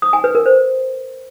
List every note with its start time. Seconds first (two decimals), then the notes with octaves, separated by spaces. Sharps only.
0.02 D#6
0.13 G#5
0.24 B4
0.35 A#4
0.46 C5